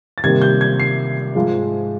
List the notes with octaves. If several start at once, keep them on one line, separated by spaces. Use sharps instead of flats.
A6
C3 D#3 G3 A#3 G#6
G6
G#6
C7
G#2 F3 G#3